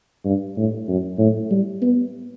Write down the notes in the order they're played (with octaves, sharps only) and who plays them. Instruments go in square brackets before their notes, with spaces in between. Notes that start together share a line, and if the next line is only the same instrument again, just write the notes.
[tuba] G2
A2
F#2
A2
G3
B3